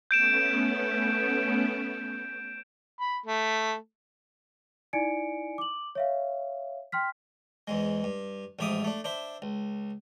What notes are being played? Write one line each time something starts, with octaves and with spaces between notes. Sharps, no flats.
A3 B3 C#4 G6 D7 E7
B5
A3
D#4 E4 D5 G#5 C#7 D7
D6 F#7
C#5 E5 F5
G5 C6 F6 B6
E2 G#2 G#3
G2
A1 G#2 F3 E5 D6 D#6
A3 D4
D4 C5 E5
C#2